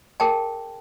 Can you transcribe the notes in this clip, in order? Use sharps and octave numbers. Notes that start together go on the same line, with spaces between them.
G#4 A#4 G5 A5